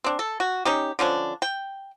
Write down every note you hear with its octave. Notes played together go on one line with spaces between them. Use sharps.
C4 D4
A4
F#4
C#4 D#4 G4
D3 F3 C#4 D4
G5